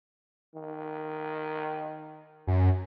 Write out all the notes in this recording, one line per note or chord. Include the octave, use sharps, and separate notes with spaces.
D#3
F#2